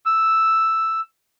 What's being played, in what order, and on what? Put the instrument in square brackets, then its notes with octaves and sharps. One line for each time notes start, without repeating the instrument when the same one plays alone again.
[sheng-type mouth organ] E6